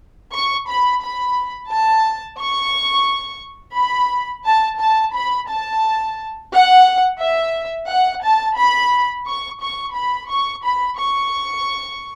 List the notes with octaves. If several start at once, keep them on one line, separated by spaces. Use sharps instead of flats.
C#6
B5
B5
A5
C#6
B5
A5
A5
B5
A5
F#5
E5
F#5
A5
B5
C#6
C#6
B5
C#6
B5
C#6